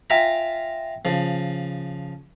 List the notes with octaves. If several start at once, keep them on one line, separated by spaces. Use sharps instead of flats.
F4 E5 G5 G#5 A#5
C#3 F3